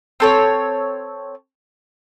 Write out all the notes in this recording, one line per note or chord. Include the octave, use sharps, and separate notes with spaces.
C4 A4 C#5